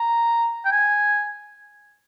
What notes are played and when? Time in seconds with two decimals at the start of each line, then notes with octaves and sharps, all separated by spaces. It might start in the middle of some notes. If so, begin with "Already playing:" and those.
Already playing: A#5
0.65 G5
0.72 G#5